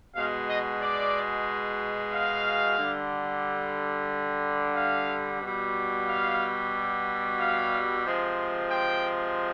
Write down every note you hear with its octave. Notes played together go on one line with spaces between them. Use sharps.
B2 G#3 F5
D#5
D5
F5
D3 G3
F5
B2 G3
F5
F5
C3 F3 G#3
G5